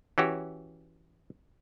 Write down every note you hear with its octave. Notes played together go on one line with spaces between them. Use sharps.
E3 C#4 F#4 G4